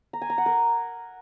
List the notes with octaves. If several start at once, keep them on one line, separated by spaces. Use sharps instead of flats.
A#5
G#5
A#5
F#5
A#4